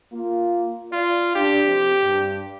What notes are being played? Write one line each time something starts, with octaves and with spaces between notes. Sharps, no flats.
A#3 F4
F4 D5
D4 G4
F2 C3
G2